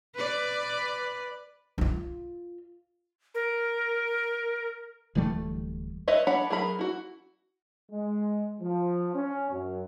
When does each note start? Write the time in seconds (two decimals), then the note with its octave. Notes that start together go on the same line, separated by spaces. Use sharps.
0.15 B4 D5
1.78 D#4 F4
3.35 A#4
5.15 D1 E3 G3 A3
6.08 B4 C#5 D#5 E5
6.27 D4 C#5 F#5 B5
6.50 F#3 G#4 A#4 B5
6.79 E4 F#4
7.91 G#3
8.61 F3
9.15 C#4
9.51 F#2